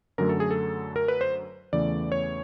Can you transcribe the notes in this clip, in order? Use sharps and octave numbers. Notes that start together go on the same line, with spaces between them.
F#2 D3 F#3 A3 A#4
A4
G#4
A4
A#4
B4
C5
E2 C#3 E3 A3 D5
C#5